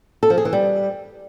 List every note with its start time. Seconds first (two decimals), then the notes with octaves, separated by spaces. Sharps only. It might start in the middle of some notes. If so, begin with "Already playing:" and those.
0.23 A4
0.30 F3
0.38 G#4
0.45 E3
0.53 G3